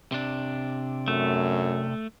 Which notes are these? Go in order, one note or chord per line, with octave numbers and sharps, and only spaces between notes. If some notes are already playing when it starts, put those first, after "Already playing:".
C3 D4
F#2 A3